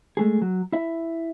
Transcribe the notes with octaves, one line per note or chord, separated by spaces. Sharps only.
G#3 A3 G#4
F#3
E4 E5